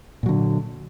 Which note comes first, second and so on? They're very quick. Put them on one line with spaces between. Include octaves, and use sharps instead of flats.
A#2 F#3 D3